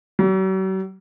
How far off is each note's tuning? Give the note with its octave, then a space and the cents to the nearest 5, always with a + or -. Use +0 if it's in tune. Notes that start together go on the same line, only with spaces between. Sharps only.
F#3 +45